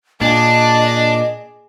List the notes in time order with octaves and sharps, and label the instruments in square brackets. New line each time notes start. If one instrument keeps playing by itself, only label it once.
[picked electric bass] A#2 [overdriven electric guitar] D4 [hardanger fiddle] G#4 D6 [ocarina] D#5